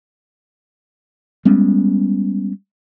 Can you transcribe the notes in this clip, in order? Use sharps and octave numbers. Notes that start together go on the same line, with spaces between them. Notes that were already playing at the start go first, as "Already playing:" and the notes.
G3 G#3 B3 C#4